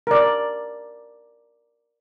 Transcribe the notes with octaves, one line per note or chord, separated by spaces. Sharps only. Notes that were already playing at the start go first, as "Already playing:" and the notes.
A#4 D5